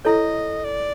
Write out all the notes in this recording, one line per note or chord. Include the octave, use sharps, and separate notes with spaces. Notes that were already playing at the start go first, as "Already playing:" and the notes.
E4 A4 C#5 D#5
D5